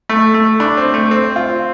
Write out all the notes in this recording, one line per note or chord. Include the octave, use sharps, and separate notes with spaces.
A3
A3
D4
C4
A3
C4
F4